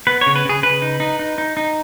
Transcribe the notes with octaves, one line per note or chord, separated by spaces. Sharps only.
B3 B4
C#5
C#3
B4
C#3 G#4
C#3 B4
D#4
D#4
D#4
D#4
D#4